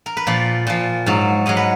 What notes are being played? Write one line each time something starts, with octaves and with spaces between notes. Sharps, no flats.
A#4
B4
A#2 F3 D5
A#2 F3
G#2 F#3
G#2 F#3 D#5
B4